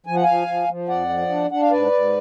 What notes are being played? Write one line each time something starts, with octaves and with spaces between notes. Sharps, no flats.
F3 G#5
F#5
F3 F5 G#5
F3
F3
F2 D5 F#5
F3
D4
D4 F#5
F5
G#2 B4 D5
G#2